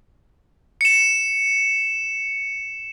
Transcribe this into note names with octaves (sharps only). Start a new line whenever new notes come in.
C#7 E7